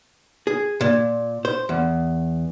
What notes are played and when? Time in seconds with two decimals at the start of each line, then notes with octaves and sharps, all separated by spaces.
0.47 G#4
0.81 A#2
1.45 C5
1.69 E2